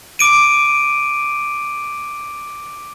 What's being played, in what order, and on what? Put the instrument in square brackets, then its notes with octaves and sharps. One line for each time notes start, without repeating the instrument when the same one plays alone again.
[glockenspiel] D6 D7 D#7